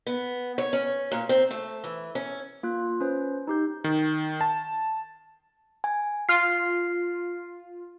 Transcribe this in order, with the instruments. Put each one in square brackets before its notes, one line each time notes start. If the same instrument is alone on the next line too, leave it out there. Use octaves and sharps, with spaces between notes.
[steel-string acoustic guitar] B3
C#5
C#4
A#2
C4
A3
E3
C#4
[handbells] A#3 F4 F#6
C#4 B4 C5
D#4 G4 G6
[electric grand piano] D#3
A5
[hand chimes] G#5
[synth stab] F4 [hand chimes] F6 C7